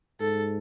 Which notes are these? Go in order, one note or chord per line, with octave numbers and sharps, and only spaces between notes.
G#2 A4